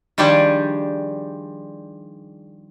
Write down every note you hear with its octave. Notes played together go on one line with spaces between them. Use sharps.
D#3 F3 G3 D4 G4 G#4